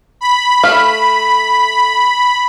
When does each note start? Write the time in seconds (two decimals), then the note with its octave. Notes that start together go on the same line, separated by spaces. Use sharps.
0.21 B5
0.64 A3 F5